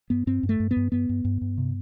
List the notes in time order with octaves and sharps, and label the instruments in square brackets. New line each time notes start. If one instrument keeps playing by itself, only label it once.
[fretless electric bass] G2 B3
G2 C4
G2
A3
G2
B3
G2
G2 B3
G2
G2
G2
C3